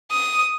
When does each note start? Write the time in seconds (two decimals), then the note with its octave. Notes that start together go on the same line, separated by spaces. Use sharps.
0.11 D#6